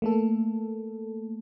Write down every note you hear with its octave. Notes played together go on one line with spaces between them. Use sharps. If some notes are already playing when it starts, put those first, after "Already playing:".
A3 A#3 A4